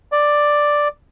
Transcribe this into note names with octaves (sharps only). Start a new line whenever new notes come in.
D5